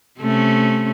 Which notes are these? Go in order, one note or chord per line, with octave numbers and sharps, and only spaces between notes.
C3 A3 C#4